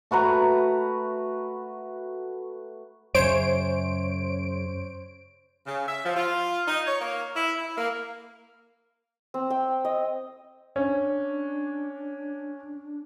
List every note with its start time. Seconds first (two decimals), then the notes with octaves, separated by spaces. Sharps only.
0.11 A3 F#4 B4 A#5
3.15 F#2 C#3 C5 C#5 D7
5.66 C#3
5.87 E5
6.05 F3
6.16 F4
6.68 D#4
6.86 C#5
7.01 A#3
7.36 E4
7.58 E4
7.78 A#3
9.34 C4
9.50 G5
9.85 D#5
10.76 C#4 D4